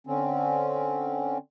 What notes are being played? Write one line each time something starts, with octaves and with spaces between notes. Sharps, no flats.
D3 C4 C#4